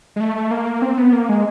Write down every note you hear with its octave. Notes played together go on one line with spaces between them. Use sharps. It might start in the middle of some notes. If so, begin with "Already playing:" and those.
G#3
A3
A3
A#3
C4
B3
A#3
G#3